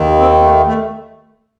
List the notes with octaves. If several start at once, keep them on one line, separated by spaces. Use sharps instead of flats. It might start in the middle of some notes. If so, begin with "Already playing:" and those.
Already playing: D#2 D#3
C4
A3
A3